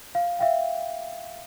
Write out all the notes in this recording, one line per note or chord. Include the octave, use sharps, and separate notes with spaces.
F5
E5 F5 G5